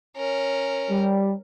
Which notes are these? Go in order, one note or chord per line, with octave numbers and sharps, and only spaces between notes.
C#4 A#4
G3